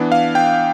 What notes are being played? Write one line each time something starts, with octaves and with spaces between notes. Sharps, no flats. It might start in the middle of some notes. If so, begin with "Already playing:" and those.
Already playing: E3 B3 D4
F5
G5